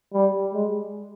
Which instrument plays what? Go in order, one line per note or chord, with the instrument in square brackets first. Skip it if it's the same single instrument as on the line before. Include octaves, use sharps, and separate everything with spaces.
[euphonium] G3
G#3